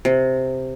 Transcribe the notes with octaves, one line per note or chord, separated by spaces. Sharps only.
C3